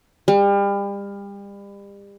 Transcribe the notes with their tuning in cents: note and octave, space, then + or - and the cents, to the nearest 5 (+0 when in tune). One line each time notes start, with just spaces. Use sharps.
G3 +35